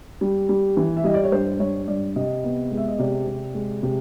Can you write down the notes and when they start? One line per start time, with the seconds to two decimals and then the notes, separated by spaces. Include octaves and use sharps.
0.21 G3
0.49 G3
0.77 E3
0.97 E5
1.04 G3 D#5
1.14 D5
1.23 C#5
1.32 G2 C5
1.60 G2 C#5
1.88 G2 D5
2.16 C3 D#5
2.44 B3
2.71 G#3
2.77 E5
2.88 D#5
2.99 C3 D5
3.27 C3
3.54 G#3
3.83 C3